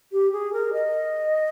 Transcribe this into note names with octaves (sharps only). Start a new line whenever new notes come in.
G4
G#4
A#4
D#5